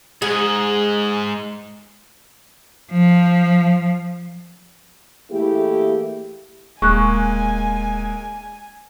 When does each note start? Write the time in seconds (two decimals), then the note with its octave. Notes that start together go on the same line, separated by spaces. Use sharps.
0.22 G#2 G#4
2.92 F3
5.31 E3 A3 A#3 E4 G4 G#4
6.82 D#1 G#3 A#3 G#5 C#6 F#6